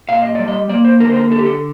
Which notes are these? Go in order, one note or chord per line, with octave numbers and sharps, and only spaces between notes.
A#2 F5
D#5
G3 D5
D#5
A#3 D5
C5
D3 A#4
C5
A#4
D3 A4
G4
A4